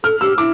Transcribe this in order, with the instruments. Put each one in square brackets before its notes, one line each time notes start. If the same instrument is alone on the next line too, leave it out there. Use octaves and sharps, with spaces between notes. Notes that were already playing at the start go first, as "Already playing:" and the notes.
[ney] A4 [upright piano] F6
[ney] G4 [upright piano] E6
[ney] E4 [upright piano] D6